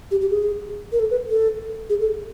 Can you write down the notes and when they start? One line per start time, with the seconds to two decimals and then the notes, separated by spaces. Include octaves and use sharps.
0.11 G4
0.21 G4
0.30 G#4
0.92 A#4
1.00 A4
1.11 B4
1.30 A4
1.90 G#4
2.00 A4